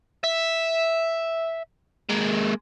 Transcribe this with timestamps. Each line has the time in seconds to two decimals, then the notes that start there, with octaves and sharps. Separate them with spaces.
0.24 E5
2.10 G#3 A#3